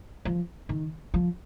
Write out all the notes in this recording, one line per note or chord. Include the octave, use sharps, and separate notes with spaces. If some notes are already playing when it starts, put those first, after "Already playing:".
F3
D#3
F3